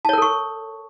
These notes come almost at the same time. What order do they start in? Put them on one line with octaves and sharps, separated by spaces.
A5 C#5 A#4 A4 C#6